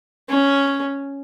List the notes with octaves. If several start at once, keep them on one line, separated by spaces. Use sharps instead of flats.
C#4